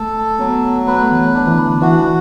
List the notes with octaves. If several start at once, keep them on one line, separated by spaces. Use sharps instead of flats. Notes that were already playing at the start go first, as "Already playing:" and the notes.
Already playing: A3 A4
F#3 B3
A3 B4
B3
A3
E3
D4
E3
D3
E3 F#4